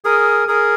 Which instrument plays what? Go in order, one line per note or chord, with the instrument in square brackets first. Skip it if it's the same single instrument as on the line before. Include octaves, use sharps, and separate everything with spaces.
[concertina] G#4 A#4 [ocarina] D#6
[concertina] G#4 A#4 [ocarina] D#6